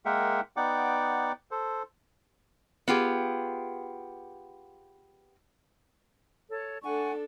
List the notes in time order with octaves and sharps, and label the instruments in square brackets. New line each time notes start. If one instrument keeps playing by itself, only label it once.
[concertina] G#3 A#3 A#4 E5 F#5 G5
B3 D#4 D5 F#5 G5 D6
A4 C5
[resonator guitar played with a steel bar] B3 F4 G4 G#4
[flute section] A4 C#5
[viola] D4 A4 [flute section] F#5 G#5 C#6